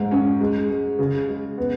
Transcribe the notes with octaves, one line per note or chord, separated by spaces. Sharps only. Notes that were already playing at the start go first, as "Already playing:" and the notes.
Already playing: G#2
C#4
G#3
G#3
C#3
G#3
B3